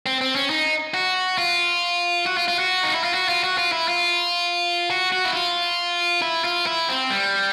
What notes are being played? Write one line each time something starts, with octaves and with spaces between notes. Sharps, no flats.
C4
C4
C#4
D#4
F#4
F4
F#4
F4
F4
F#4
D#4
E4
F4
F#4
F4
F#4
F4
E4
F4
F#4
F#4
E4
F4
E4
F4
E4
C4
G3